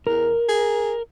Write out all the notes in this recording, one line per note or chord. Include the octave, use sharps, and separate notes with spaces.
E2 A#4
G#4